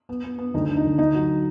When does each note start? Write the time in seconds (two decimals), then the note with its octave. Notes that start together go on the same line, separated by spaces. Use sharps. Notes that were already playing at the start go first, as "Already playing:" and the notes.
0.09 B3
0.24 B3
0.38 B3
0.54 D2 D#4
0.69 D3
0.77 D#4
0.84 D2
0.98 D3 D#4
1.14 F#3